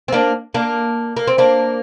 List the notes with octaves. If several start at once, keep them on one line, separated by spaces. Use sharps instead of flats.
C4
A#3 D4
A#3 D4
A#3
C4
A#3 D4